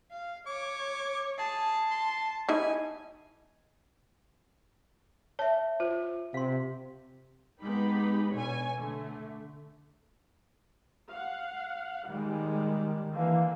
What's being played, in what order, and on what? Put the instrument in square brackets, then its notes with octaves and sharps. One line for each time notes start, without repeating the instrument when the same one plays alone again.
[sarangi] F5
[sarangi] C#5 [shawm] D6
[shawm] G#4 [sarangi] A5
[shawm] C6
[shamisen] D#4 E4 [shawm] G#5
[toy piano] C#5 E5 [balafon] A5
[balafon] F4 [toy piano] C5
[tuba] C3 [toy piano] F5 C6
[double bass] G#3 B3 [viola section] D#4 G4 B5
[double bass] B2 [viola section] D3 C#5 G#5
[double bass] D3 [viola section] A3
[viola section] F5 F#5
[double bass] D#3 [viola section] G3 G#3
[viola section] D3 A#3 [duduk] E3 [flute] F5